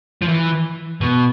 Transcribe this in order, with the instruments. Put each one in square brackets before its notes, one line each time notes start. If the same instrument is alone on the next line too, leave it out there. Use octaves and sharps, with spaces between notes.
[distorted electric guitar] F3
E3
B2